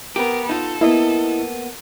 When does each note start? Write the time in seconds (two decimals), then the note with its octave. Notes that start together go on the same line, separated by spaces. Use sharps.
0.16 B3 G4 A#4
0.49 D#4 F4 A4
0.81 A#3 B3 E4 D#5